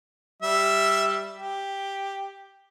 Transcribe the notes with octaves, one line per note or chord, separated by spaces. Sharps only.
G3 E5
G4